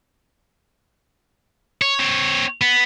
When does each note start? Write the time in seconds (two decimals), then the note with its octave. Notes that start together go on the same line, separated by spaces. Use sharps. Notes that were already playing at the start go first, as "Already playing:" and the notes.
1.82 C#5
1.99 C4 C#5
2.61 B3